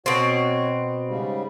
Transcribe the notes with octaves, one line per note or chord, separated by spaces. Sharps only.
B2 C4 F#4 C#5
G#2 C#3 G3